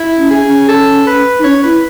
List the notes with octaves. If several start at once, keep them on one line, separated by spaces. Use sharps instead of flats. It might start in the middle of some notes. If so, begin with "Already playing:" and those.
Already playing: E4
C#4
G#4
C#4
A4
B4
D#4
C#4 C#5
E4 B4